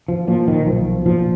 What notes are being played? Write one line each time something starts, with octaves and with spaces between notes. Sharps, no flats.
F3
A#2 F3
D#3
B1 F3
A#2 F3